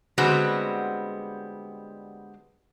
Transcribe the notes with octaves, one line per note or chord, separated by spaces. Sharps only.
D3 G3 G#3 B3 C4 F#4